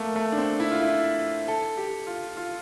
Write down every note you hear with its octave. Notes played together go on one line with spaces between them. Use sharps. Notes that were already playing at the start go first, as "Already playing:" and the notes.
Already playing: A3 A#3
A3
D4
C4
E4
F4
E4
A4
G4
F4
F4